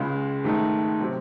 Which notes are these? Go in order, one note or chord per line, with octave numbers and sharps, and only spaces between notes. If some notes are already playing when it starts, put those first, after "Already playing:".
Already playing: C#2 C#3 G#3
G#2 D#3 A3 D#4
C3 F#3 C4